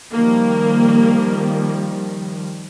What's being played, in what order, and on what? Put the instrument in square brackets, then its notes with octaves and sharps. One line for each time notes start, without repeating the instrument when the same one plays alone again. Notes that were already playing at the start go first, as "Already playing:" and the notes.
[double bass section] D#3 F3 G3 [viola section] A#3